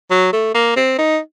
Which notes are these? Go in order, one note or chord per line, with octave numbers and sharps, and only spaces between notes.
F#3
A3
A#3
C4
D#4